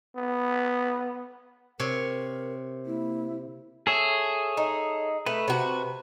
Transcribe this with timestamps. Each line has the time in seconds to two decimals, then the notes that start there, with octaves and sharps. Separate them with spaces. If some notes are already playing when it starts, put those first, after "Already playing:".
0.16 B3
1.80 C3 A#4 C#5
2.86 A#3 E4
3.87 G#4 A4 C#5 E5
4.57 D#4
5.26 A3 B4
5.48 C3 F#4